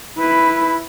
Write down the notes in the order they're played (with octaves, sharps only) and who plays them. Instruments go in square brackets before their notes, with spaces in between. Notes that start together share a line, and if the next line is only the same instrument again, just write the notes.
[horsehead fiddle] E4 B4